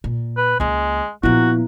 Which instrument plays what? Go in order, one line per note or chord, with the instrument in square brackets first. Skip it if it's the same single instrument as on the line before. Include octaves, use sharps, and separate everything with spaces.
[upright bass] A#2
[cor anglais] B4
[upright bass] C#2 A#3 [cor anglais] G#3
[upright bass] A#2 F3 [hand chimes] B3 E4 [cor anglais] F#4